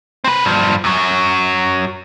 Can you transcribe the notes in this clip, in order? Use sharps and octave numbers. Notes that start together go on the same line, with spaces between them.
C4 B4
G2 F3
F#2 F#3